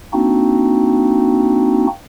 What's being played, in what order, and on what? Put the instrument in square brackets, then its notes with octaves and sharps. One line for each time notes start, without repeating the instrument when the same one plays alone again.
[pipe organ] A#3 C4 D4 D#4 F#4